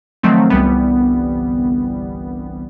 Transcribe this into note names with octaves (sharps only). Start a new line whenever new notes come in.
D#3 F3 F#3 A3 C4
G1 C2 E3 G3 B3